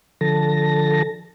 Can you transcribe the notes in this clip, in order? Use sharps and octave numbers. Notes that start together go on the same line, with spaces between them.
D3 F3 A4 A5 A#6